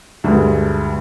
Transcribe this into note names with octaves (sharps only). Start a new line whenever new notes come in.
D2 G2 G#3